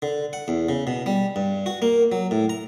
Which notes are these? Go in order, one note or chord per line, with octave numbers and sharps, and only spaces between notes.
D3
F#5
E2
C#3
B2
G3
G2
F#4
A#3
F#3
A2
A#5